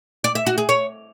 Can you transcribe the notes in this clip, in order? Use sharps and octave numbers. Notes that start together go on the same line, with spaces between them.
D5
E5
F#4
G#4
C#5